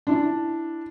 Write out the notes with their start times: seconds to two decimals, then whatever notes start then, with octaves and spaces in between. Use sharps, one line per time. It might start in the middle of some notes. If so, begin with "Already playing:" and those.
0.07 D4 E4